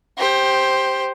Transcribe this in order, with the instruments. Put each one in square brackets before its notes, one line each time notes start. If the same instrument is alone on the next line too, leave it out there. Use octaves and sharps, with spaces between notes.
[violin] G4 C5